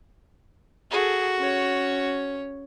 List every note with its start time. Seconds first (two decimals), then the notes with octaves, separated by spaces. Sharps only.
0.91 F#4 G#4 A4
1.38 C#4 C#5